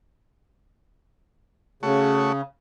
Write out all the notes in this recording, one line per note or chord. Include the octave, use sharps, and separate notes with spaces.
C#3 A3 F#4 C#5